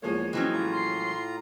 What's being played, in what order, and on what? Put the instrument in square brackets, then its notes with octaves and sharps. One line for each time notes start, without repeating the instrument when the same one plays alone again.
[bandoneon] E2 C#5 [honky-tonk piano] F3 G#3 A#3
[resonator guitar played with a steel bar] E3 F#3 C#4 [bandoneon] C4 D#5
[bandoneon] A2 F4 A#5
[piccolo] C6